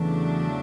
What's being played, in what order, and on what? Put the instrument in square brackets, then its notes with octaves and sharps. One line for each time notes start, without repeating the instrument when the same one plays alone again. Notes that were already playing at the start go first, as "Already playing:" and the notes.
Already playing: [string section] E2 C#3 F#3 A3 D4 [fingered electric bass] E3